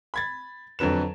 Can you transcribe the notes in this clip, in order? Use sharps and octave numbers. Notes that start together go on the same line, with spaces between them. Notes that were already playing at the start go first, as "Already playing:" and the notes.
B5 G#6 A6
F2 D3 F#3 B4 E7